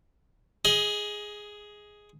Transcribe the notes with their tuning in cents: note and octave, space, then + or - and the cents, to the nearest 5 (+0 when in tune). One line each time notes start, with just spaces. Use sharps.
G#4 +0 D#5 +20